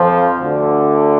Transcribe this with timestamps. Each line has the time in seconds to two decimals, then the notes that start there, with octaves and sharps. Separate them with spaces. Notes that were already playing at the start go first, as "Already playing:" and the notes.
Already playing: F2 F3
0.41 D2 D3